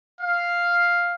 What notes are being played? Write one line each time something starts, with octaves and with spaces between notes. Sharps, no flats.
F5